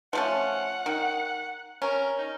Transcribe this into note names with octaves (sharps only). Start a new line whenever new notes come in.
F3 A3 C#4 F#5
D#3
C#4 A#4
D#4